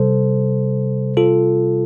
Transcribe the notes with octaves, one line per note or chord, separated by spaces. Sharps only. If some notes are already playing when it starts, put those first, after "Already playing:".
Already playing: C3 G3 A4 C5
F4 A4